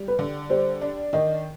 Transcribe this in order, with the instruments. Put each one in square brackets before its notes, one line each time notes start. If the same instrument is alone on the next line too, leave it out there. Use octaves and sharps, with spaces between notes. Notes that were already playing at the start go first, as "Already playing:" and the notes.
Already playing: [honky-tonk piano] G3
[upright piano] B4
[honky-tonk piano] D3
[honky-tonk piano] G3 [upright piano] C5
[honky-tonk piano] D4
[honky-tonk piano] D#3 [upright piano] D#5